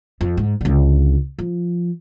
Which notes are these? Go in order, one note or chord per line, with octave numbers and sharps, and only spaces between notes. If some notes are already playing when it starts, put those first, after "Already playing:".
F2
G#2
C#2 D3
F3